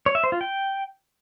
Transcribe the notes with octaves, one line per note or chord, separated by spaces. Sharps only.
C#5
E5
C5
F4
G5